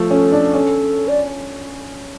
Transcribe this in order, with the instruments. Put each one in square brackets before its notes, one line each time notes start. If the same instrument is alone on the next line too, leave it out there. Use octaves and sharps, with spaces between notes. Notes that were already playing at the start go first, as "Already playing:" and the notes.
Already playing: [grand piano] F3 A3 [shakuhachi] A4
[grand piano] C#4
D4
C#4
[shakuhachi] D5